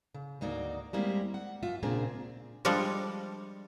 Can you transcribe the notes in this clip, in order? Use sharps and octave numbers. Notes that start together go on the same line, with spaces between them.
C#3
D2 G#2 A#3 D#4 F#4 D5
G3 G#3 A#3 C4 E4
F#5
F#2 F4 E5
A#2 C#3 A#3 C4 D4 G#4
F3 G3 G#3 D4 A4